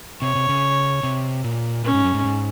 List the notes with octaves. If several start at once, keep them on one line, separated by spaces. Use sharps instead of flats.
C3 C#5
C3
C#3
C3
A#2
A#2 C#4
G#2
F#2
G#2
G#2